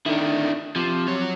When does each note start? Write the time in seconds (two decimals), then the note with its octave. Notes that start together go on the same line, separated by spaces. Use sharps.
0.06 D3 D#3 D4 E4
0.76 C3 F3
1.08 F#3 C#5